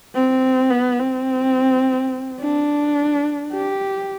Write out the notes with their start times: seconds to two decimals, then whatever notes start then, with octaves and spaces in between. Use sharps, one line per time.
0.15 C4
0.71 B3
1.00 C4
2.40 D4
3.53 G4